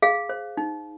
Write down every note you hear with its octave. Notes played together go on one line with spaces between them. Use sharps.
G#4 F5
C5
D#4